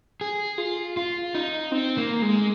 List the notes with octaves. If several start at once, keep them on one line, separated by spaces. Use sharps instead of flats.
G#4
F4
F4
D#4
C4
A#3
G#3